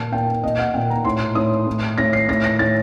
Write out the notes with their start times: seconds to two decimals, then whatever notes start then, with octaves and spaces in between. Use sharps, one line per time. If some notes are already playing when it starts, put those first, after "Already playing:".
Already playing: A#2 A5
0.12 A#2 G5
0.44 A#2 D#5
0.59 F#5
0.74 A#2 G5
0.90 A#5
1.04 A2 C6
1.35 A2 D#6
1.67 A2
1.98 A2 A#6
2.13 C7
2.29 A2 A#6
2.44 A#6
2.59 A2 A6